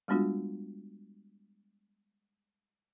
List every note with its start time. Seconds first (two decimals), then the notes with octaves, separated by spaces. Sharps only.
0.08 G3 G#3 B3 D4 F4 F#4